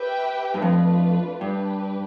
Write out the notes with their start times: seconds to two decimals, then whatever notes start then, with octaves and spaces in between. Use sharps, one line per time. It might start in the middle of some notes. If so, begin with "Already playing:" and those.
Already playing: G4 B4 E5 G5
0.54 G2
0.62 F2 A3 D4 F4 B4
1.41 G2 D4 G4 B4